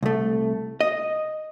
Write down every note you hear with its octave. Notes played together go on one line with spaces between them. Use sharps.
C2 A3
D#5